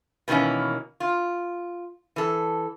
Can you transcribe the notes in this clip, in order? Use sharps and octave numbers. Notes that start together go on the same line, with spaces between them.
B2 D#3 E3 A#3 C#4
F4
E3 A4